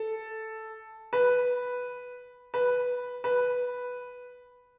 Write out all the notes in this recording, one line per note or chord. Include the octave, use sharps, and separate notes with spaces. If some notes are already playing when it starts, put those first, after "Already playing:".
Already playing: A4
B4
B4
B4